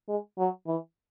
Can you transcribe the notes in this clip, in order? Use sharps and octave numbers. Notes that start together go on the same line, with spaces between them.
G#3
F#3
E3